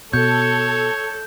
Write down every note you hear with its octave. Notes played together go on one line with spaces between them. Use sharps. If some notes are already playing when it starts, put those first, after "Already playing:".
B2 A4 C#5 G6